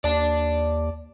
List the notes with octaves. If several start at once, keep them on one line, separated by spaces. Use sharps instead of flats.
D#2 D5 A5